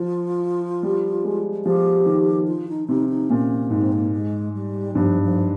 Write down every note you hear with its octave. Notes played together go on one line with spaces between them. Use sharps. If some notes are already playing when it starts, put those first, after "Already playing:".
Already playing: F3 F4
G3
G#3
F3 G4
D#3
F4
D#4
C3 D#4
D#4
A#2 C#4
G#2 A#3
C4
A#3
G#3
G3
G2 F3
F3